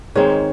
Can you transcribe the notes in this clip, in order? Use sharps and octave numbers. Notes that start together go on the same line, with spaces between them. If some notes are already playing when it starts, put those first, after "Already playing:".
G#2 D#3 G#3 C4 C#5